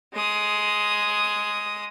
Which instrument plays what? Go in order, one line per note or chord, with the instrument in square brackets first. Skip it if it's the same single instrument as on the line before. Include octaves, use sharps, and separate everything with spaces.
[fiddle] G#3 D#6